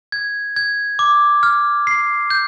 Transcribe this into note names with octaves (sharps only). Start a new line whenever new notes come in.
G#6
G#6
D6
F6
C7
G6